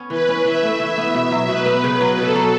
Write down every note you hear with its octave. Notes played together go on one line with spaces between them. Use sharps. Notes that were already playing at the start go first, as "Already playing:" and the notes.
Already playing: B3 C#4
E3 B4
C#4
E3 E5
A3
E3 E5
B3
B2
F#3
B2 B4
B3
C#3
F#3
B2 A4
F#3